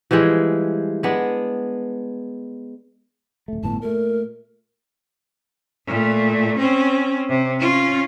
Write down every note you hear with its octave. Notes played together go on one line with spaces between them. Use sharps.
E3 F3 G3 G#3
G#3 B3 D4
D1 A3
G1 A2 B3 A5
A#2 A3 A#4
A#2 A3
C4 C#4
C3
C#4 F4